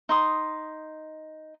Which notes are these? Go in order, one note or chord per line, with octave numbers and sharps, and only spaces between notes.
D#4 C6 D#6